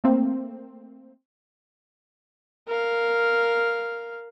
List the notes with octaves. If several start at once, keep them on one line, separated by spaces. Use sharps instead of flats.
A3 A#3 C4
A#4 F5